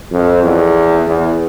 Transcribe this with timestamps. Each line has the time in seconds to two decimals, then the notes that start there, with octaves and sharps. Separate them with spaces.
0.12 F2
0.43 E2
1.07 E2